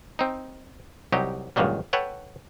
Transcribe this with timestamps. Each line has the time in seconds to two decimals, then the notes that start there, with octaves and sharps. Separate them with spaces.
0.19 C4 D#4
1.12 C2 F#3 D#4 G4
1.56 C#2 G2 A#2 D#3 F#3 G3
1.93 A4 B4 C#5 F#5 G5